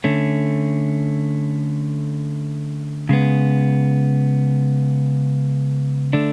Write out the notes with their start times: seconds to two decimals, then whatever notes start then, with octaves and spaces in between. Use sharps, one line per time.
0.04 D3 A3 C#4
3.09 C#3 G#3 B3
6.13 D3 A3 D4